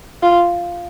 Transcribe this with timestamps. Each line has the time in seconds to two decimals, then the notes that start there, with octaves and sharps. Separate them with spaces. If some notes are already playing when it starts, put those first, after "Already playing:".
0.22 F4